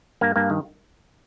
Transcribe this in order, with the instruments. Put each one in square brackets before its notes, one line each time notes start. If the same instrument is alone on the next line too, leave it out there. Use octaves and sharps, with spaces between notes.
[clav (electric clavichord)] G2 A#3
G2 A#3
D#3